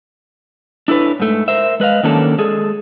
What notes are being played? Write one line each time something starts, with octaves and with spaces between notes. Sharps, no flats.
D4 E4 A4 B4 C#5
G#2 A3
A#4 C5 E5
G#3 B4 D#5 F5
D#3 F#3 A#3 C#4 D4 A4
G#3 G#4 A4